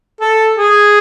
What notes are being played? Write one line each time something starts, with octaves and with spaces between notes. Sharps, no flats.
A4
G#4